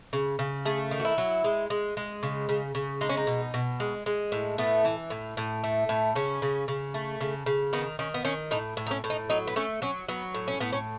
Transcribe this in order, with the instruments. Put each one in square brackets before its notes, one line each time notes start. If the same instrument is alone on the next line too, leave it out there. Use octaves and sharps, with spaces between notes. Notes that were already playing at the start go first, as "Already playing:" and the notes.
[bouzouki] C#3
C#3
A3 G#4
D#3
F#4
E4
F#3
G#3
G#3
G#3
C#3
C#3
C#3
G#3 D#4
C#4
D#4
B2
B2
G#3
G#3
A2
A3 B3
E3
A2
A2
A3
A2
C#3 C#4
C#3
C#3
A3
C#3
C#3
D#3 B3
D#3 C#4
B3
D#3 C#4
A2 D#4
A2
D#4
C#4
A2
D#4
F#3 D#4
B3
A3 C#4
F#3 C#4
F#3 B3
A2
C#4
A2 B3
C#4